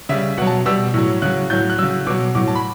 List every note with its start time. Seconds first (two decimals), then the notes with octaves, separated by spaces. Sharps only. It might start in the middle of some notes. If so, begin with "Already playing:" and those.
0.09 C#3 G3 E5
0.37 B2 F#3 F#5
0.47 A5
0.66 B2 G3 E6
0.94 A2 F#3
1.22 C#3 F#3 F#6
1.50 A2 F#3 G6
1.70 F#6
1.78 C#3 F#3 E6
2.07 B2 F#3 D6
2.35 A2 F#3 D6
2.48 A5
2.55 B5